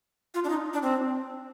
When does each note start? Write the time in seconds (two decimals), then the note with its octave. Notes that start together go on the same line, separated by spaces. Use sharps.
0.34 F4
0.44 D4
0.49 D#4
0.73 D4
0.82 C4